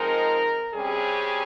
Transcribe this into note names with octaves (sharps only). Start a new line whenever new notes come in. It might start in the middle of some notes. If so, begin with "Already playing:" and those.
Already playing: F3 G#3 C4 D#4 A#4
C3 G3 C#4 G#4